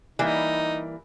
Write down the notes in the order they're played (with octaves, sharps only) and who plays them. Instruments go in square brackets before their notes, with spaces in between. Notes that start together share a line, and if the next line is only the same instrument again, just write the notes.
[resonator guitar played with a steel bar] E3 G3 A#3 [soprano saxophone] D#4